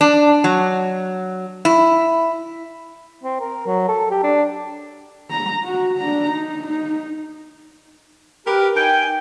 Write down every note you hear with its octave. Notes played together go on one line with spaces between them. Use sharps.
D4
F#3
E4
C4
A#4
F#3
A4
G4
D4
A#5
F#4
D4 A#5
D#4
D#4
G4 A#4 B4
D#4 G5 G#5